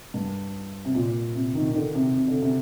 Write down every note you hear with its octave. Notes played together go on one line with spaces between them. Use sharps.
G2
C3
A#2
C3
D#3
D#3
D3
C3
C3
D3
C3